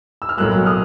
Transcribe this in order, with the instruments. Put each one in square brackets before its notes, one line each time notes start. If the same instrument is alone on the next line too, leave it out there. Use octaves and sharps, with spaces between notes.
[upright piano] E6
F6
[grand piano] B1 A2 F#3 A#3 [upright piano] E6 F#6
[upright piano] D#6 F6